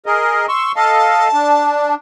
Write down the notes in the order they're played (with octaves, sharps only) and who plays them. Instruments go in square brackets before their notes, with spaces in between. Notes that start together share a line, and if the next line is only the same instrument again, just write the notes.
[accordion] G#4 A#4 D#5
C6 C#6 E6
[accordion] A4 D#5 F5 [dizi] A5
[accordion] D4